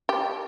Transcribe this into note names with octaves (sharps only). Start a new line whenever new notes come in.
G4